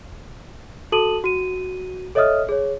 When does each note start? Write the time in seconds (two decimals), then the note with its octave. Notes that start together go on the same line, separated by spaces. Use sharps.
0.92 F#4 A4 A5 D#6 D#7 F#7
1.24 F#4 D#7
2.15 A4 C#5 D#5 E5 D#6 F6
2.49 G#4 C#5